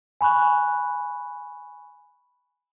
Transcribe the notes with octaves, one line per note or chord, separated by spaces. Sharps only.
G#5 B5 C#6 F#6